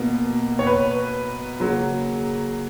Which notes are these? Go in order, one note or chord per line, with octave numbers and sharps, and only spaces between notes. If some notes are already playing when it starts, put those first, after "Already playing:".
Already playing: B2 A#3
C#5
B4
C#3 F#3 A#3